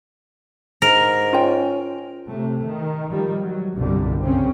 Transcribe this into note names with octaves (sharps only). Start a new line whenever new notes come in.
G#2 A#4
C#4 F4 G5
C3 A3
D#3
D#3 F3 G3
F#3
G1 C2 B2 D3 G3
F#2 C#3 C4 C#4